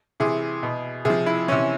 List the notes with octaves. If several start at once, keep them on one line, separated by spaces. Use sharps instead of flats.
C3 E3 G#4
B2
C3 F3 G#4
E4
C3 E3 C#4